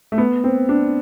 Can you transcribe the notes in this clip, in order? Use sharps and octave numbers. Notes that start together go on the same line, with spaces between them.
A3
B3
C4
D4